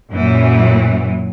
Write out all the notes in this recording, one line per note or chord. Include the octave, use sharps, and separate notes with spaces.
F#2 A#2 E3 F#3